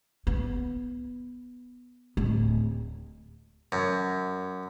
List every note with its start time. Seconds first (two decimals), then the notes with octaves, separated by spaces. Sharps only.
0.27 B3
2.17 D1
3.72 F#2